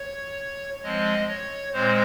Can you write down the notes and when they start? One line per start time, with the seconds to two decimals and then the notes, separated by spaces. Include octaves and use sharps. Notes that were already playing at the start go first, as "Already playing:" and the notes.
Already playing: C#5
0.83 F3 G#3 C4 D#5
1.28 C#5
1.73 A#2 G#3 C4 C5